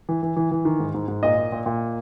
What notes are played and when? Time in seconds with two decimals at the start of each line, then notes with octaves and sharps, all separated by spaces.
0.09 E3
0.23 E3
0.37 E3
0.51 E3
0.65 D#3
0.80 G#2
0.94 G#2
1.08 G#2
1.23 A#2 D#5
1.37 A#2
1.52 A#2
1.66 A#2